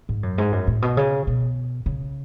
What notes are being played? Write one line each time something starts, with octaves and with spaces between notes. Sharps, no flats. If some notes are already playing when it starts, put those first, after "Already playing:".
G#2
F#2
G#2
F#2
A2
B2
C#3
B2
C#3